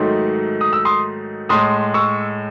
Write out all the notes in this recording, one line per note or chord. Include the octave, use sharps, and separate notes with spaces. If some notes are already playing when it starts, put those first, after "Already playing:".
Already playing: G#2 D#3 F#3 A3 C6
D#6
E6
C6 D#6
A2 G#3 C6 D#6
C#6 E6